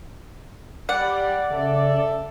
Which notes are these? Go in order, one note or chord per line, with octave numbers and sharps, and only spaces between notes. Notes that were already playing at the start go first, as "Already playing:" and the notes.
G3 D5 F#5
C#3 A4 E5